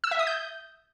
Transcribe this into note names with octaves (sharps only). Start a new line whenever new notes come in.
E6
E5
D#6
G6